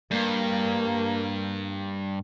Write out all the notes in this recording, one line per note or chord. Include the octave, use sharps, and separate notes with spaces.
G2 A#3